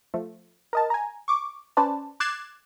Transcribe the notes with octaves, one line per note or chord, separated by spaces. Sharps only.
F3 A3
A#4 D#5 A5
G#5 A#5
C#6 D6
C#4 B4 C5 D5 A5
D6 F#6 G#6 A6 C7 E7